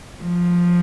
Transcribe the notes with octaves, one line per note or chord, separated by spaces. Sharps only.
F3